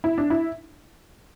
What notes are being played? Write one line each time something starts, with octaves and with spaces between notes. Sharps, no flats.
E4
D4
E4